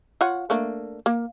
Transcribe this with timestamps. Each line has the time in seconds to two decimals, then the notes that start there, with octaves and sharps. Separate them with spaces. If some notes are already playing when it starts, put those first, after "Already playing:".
0.21 F4 C#5 F#5
0.50 A3 A#3 D4
1.06 A#3